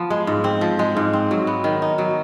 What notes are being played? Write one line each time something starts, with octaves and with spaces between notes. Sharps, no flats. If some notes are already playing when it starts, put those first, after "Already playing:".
Already playing: F3 B3
G#3
G#2
C4
F3
G#3
G#2
C4
F#3
B3
D#3
D#4
F#3